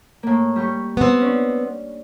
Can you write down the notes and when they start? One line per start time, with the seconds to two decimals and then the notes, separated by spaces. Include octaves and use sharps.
0.23 A2 A#3
0.56 G3 G4 C#6
0.97 B3 C4
1.21 C#4 D4